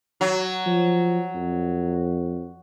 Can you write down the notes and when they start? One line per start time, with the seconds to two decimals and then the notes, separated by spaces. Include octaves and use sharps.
0.21 F#3
0.66 F3
1.35 F2